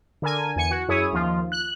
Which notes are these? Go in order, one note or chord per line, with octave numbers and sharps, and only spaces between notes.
D3 A#4 G#5
E2 G#5 C#7
F#4
F#2 E4 G#4 C#5 D#6
D#2 F3 F4
F#6